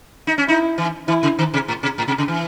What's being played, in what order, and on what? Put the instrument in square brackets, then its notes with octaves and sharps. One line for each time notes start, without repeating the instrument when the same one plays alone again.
[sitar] D#4
C#4
[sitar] D#4 [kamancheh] E4
[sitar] E3
[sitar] E3 [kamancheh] E4
[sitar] C#3
D#3
C3
A2
C3
A2
C3
C#3
E3